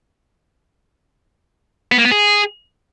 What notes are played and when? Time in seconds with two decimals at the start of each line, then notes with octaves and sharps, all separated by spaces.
1.92 B3
1.98 A#3
2.05 B3
2.11 G#4